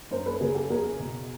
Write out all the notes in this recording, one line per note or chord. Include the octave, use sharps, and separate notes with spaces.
F#2 A#4 C5
A4 B4
C#3 G#4 A#4
G4 A4
E2 G#4 A#4
B2